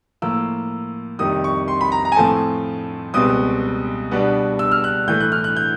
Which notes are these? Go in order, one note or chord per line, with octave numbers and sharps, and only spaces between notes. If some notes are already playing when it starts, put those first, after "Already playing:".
A2 F3 A#3 E6
F2 C3 D#3 G3 D#6
C#6
C6
B5
A#5
A#5
G#5
A2 F3 A3 C4 A5
C#2 B2 G3 C4 D#6
B2 G3 B3 D4
E6
F6
F#6
A2 E3 A3 G6
F#6
F6
F#6
G6